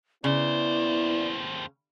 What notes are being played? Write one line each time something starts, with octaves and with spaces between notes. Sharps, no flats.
D#2 C#3 B3 E4 C5 D5